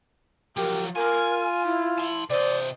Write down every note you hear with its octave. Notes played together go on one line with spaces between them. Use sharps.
F3 F#3 G4 A#4
F4 A#4 G#5
E4
A5 C6
C3 C5 D5 D#5